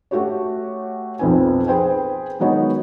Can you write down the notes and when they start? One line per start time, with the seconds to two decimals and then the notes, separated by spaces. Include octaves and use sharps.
0.11 A3 F#4 G4 C#5
1.19 B1 F2 C4 B4 G#5
1.67 G#4 B4 C5 G5 G#5
2.39 D#3 F#3 G#3 B3 D#4 C#5